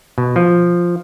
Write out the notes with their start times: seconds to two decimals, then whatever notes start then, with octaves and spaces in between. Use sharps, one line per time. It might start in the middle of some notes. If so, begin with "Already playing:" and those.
0.18 B2
0.36 F3